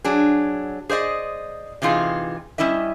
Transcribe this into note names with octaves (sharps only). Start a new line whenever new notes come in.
F#3 D4 G#4
G#4 C5 D5 D#5
C3 E3 D#4 F4 G#4
G3 C#4 E4 D#5 E5